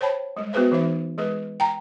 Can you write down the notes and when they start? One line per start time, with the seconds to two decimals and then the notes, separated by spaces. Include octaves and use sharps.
0.01 C5 C#5 G5 A5 B5
0.37 G3 G#3
0.53 B3 F#4 G#4 B4 C5 E5
0.72 E3 D#4 E5
1.18 G#3 G#4 B4
1.60 G5 A#5